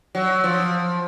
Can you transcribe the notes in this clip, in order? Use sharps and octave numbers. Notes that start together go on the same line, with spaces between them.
F#3
F3